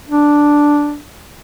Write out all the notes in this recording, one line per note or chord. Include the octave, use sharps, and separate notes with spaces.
D4